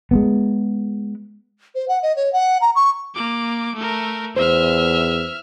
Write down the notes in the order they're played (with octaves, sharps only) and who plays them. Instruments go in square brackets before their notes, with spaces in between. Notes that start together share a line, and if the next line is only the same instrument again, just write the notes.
[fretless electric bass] G#3 A#3 B3
[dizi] C5
F#5
D#5
C#5
F#5
A#5
C#6
[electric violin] A#3 D6
A3 A#4
[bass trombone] E2 [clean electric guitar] C5 [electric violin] E5 F6